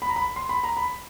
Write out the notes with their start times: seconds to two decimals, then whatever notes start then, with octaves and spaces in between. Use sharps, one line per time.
0.02 B5
0.09 A#5
0.16 B5
0.36 C6
0.49 B5
0.63 A#5
0.77 B5